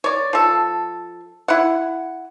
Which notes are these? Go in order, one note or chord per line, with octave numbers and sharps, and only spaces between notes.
C#5 D5
F3 A4
E4 F#5